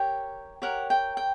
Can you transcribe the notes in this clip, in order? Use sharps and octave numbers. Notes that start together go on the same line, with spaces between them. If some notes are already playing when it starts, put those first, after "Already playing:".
Already playing: G4 A#4 C#5 G5
G4 A#4 C#5 F#5
G5
G5